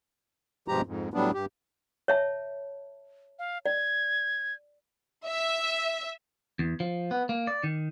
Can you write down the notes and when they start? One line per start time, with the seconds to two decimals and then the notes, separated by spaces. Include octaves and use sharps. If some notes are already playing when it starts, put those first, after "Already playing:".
0.68 G2 B2 F3 G#3 G4 A#5
0.86 F2 G#2
1.14 A2 F#3 G3 B3 D4
1.34 G2 G4
2.08 C#5 E5 A5
3.39 F5
3.66 D5 G#6
5.26 E5
6.59 E2
6.80 F3
7.11 B3
7.29 A#3
7.47 D5
7.64 D#3